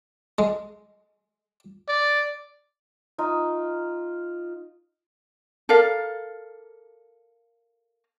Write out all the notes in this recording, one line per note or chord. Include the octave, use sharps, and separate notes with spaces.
G#3
D5
D#4 F4
A4 A#4 D5 F5